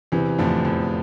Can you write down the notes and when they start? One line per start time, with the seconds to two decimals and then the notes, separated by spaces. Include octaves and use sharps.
0.12 E2 C3 E3
0.38 F2 A2 D3 F3 C4
0.65 E2